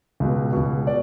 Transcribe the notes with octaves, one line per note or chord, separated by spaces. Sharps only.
C#2 B2
C#2 B2
D5